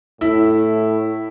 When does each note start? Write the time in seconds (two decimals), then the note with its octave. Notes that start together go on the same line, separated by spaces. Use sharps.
0.21 A2 E4